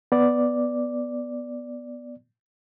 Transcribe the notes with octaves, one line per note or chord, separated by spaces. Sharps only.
B3 D5